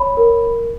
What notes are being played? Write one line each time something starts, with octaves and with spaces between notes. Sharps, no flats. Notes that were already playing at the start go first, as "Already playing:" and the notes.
Already playing: C#5 B5
A#4